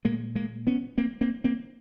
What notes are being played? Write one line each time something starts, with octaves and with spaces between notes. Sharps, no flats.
A#2 G#3 A#3
G#3 A#3
B3 C#4
A#3 C4
A#3 C4
A#3 C4